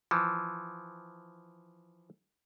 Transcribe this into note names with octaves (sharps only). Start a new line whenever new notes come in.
E3 F3